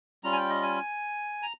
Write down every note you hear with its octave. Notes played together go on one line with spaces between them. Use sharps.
G3 C#4 F4 A#5
G#5
G5
D#5
G#5
A#5